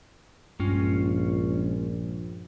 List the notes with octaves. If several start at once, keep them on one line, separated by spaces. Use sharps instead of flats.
A#1 G2 G#3 C#4 F4